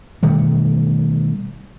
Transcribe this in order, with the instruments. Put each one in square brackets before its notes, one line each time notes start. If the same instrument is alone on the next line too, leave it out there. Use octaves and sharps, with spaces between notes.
[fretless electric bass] B2 D#3 G3 A3